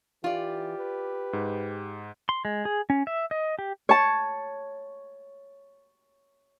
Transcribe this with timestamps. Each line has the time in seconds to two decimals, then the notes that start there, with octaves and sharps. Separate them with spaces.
0.24 E3 F4 G4 D5
0.78 B4
1.33 G#2
2.29 C6
2.45 G#3
2.65 G#4
2.90 C#4
3.07 E5
3.31 D#5
3.59 G4
3.89 C#5 A5